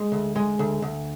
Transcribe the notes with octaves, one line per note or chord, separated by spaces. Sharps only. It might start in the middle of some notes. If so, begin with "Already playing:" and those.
Already playing: G#3
D2
G#3
D2
D2